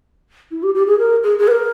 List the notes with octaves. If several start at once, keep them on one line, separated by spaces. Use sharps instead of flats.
E4
G4
G4
G#4
A#4
G#4
G#4
B4
A#4